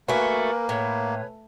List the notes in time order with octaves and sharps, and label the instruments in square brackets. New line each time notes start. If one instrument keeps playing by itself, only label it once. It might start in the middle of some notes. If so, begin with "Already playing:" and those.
[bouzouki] A3 F#4 [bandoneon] A#3 [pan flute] A#4 [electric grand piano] B4 G#5
[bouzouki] A2 [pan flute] C#5